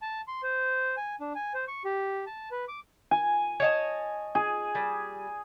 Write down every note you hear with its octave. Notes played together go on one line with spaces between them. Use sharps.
A5
C6
C5
G#5
D4
G#5
C5
C#6
G4
A5
B4
D6
G#5
C#5 D#5 A5
G#4
G3